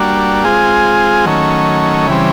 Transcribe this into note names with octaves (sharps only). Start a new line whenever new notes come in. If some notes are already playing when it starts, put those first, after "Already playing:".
Already playing: G3 A#3 D4 F#4
G#3 C4 F4 G#4
D#3 F#3 A3 C#4
C#3 E3 G3 C4